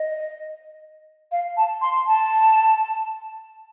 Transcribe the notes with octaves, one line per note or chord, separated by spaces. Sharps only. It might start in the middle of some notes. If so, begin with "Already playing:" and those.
Already playing: D#5
F5
A5
C6
A5